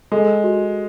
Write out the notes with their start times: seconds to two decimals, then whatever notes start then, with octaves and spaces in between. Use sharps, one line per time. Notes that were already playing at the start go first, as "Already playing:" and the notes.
0.12 G#3 A4
0.44 F#4